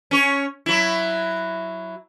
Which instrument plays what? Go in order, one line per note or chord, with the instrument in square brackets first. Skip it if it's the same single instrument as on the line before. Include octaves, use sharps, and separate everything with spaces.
[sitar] C#4 C#5
F#3 E4